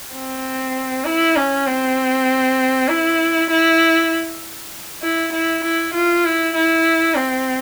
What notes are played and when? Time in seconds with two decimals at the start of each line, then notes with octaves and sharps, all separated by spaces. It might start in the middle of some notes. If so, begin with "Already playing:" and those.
0.14 C4
1.05 E4
1.36 C#4
1.67 C4
2.89 E4
3.50 E4
5.02 E4
5.33 E4
5.63 E4
5.94 F4
6.25 E4
6.55 E4
7.16 C4